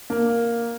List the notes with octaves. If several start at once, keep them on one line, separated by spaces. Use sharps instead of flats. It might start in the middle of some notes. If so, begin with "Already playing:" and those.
A#3